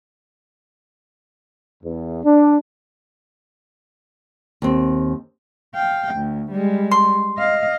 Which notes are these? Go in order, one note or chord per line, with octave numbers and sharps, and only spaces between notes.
E2
D4
D#2 C4
F5 G5
D2
G3 G#3
C6
D#5 F5